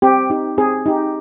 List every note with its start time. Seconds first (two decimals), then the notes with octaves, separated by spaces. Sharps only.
0.02 C4 G4
0.30 D#4 G4
0.58 C4 G#4
0.86 D#4 G4